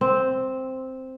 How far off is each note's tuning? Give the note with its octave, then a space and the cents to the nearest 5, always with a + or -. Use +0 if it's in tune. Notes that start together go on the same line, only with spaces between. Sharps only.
C4 +0